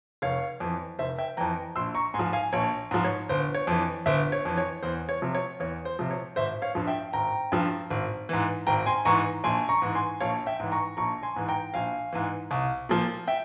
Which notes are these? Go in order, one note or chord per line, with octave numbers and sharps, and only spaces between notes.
F1 C#5 F5
F2 E3
F1 C5 E5
E5 G5
F2 E3 G5 A#5
A#1 C6 E6
A#5 C#6
G#2 G#5 C6
F3
F5 G#5
A#1 C#5
G#2 F3
C#5
G1 C5
C#5
F2 E3
G1 C5 E5
C#5
F2 E3
C#5
E2 C5
C#5
C3 F3
C#5
E2 C#5
C5
C3 F3
C#5
G#1 C5 E5
C#5 F5
G2 F3
E5 G5
G#1 G5 A#5
G2 F3
G#1
G#2 E3
G#1 G5 A#5
G#5 C6
G#2 E3 A#5 C#6
A#1 G#5 C6
A#5 C#6
G#2 E3
G#5 C6
A#1 C#5 F5
E5 G5
G#2 E3
A#5 C#6
A#1 A#5 C#6
G#5 C6
G#2 E3
G5 A#5
A#1 F5 G#5
G#2 E3
C2
A#2 F3
E5 G5